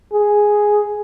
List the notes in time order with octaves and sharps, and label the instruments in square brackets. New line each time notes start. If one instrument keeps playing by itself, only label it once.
[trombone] G#4